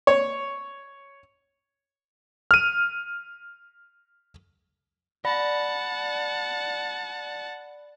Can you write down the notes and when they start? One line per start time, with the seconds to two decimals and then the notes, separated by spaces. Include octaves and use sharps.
0.07 C#5
2.51 F6 D#7
5.25 D5 F#5 A5 B5